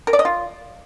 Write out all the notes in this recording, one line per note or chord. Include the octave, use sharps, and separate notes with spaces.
A#4
D5
D#5
F4